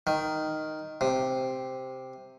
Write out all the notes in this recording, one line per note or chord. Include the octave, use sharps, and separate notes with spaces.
D#3
C3